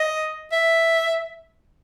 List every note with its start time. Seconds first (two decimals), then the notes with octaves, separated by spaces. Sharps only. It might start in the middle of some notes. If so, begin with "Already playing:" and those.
Already playing: D#5
0.52 E5